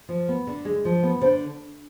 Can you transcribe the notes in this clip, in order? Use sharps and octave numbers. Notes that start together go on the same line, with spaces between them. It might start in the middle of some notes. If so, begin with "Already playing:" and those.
F3
B3
D3
G#3
F3
B3
D3 C5